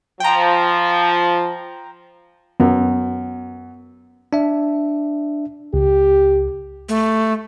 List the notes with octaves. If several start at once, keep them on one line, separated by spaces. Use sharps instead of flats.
F3 G5 A#5
F#2 B3
D4 E5
C#2 G4
A3